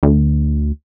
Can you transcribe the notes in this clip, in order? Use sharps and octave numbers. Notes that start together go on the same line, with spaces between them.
D2